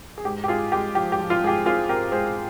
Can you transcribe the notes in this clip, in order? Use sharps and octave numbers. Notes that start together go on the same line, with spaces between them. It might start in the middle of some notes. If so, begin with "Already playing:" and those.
G#4
G#2 G4
G4
G#3 F4 G#4
G#3 G4
F3 G4
G4
F3
F4
G#2 G#4
G4
C4 F4 G#4
C4 G4 A#4
G#2 G#4 C5